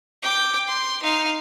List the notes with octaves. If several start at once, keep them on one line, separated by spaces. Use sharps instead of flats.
G5 D6
C6
D#4 F5